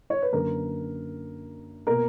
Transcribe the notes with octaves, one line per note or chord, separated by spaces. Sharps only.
C#5
B4
F#2 D3 A#3 A#4
B2 A#3 A#4